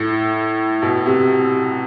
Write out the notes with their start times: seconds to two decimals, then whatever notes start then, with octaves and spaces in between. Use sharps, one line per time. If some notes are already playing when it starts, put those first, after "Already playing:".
Already playing: A2
0.82 B2
1.06 C3